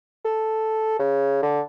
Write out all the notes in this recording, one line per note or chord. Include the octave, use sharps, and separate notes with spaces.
A4
C#3
D3